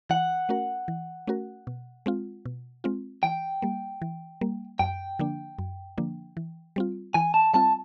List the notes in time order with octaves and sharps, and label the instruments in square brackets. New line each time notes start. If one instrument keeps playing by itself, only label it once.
[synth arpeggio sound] E3 [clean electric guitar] F#5
[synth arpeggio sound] A3 C#4 F#4 A#4
E3
A3 C#4 F#4 A#4
B2
G#3 C4 F4
B2
G#3 C4 F4
[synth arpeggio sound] E3 [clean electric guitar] G5
[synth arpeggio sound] G3 A#3
E3
G3 A#3
[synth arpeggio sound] F#2 [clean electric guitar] G5
[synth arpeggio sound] D3 F3 A#3 D4
F#2
D3 F3 A#3 D4
E3
G3 C4 F4
[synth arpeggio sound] E3 [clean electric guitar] G#5
[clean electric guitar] A5
[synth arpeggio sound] G3 C4 F4 [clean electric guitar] A5